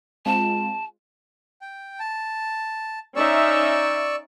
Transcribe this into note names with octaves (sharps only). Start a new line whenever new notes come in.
G#3 C4 F4 A5
G5
A5
C#4 D#4 D5 E5 C#6 E6